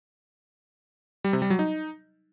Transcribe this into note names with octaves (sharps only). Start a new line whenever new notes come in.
G3
C3
G3
F#3
D#4